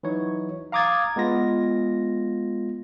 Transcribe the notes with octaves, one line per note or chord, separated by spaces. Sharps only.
E3 F#3 D#4 C#5
F5 A#5 D6 D#6 G#6 A6
G#3 B3 F4 A#6